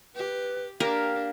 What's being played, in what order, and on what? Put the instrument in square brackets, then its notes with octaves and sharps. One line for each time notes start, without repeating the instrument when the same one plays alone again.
[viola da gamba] G4 [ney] B4
[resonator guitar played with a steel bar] A#3 G4 [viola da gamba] D4 [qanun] A#4 [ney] F5